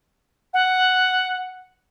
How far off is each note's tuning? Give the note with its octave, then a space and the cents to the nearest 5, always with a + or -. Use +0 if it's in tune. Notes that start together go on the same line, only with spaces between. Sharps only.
F#5 +0